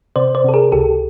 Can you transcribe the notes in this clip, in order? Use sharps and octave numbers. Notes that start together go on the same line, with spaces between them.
C3 C5 D5
C5 D5
C3 A4
G#4 A#4
C#2 G4 A4